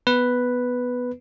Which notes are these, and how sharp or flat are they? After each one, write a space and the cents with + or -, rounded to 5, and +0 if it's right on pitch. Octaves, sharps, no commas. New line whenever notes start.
B3 +0 B4 +0